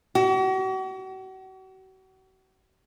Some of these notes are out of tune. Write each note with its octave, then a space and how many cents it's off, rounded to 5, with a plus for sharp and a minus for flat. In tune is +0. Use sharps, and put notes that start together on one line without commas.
F#4 +40